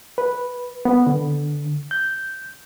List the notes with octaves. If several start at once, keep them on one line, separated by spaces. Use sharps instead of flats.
B4
B3
D3
G6